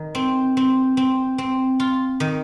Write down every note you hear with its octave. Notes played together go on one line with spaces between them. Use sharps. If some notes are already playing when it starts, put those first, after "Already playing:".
Already playing: D#3
C4
C4
C4
C4
F4
D#3